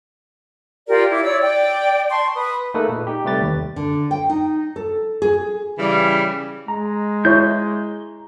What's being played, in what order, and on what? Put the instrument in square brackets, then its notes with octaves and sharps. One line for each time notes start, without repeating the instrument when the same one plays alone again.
[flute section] F4 G4 A#4 D5
E4 D6
C#5 D5 E6
D5 G5
A5 C6 C#6
B4 D#6
[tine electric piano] A3 A#3 D#4 G#4 A4 B4
A#2
D#4 G4
C3 G3 A3 G4 B4 A6
D#2
[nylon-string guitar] D3
G5
D#4
A4
G#4
[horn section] C#3 E3 G3
[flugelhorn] G#3 [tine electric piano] A#5
[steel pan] E4 C#5 [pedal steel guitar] G6